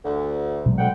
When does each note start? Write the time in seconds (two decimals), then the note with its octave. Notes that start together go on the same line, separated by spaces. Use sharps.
0.04 D2
0.66 B2 F#3 G#3
0.78 D2 F#5 G5